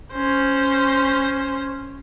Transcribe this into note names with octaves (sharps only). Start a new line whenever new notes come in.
C#4 C5